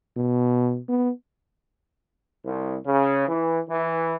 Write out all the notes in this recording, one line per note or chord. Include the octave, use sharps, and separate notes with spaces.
B2
B3
C2
C#3
E3
E3